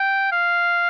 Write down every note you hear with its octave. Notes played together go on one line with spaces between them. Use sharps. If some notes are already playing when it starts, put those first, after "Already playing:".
Already playing: G5
F5